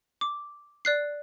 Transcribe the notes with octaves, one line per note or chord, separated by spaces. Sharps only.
D6
D5 F#6 C7